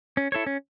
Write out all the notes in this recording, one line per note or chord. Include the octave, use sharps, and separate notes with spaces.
C#4
E4 A4 C#5
C#4